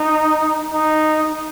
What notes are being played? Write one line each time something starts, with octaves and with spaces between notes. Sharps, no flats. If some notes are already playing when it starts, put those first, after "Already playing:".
Already playing: D#4
D#4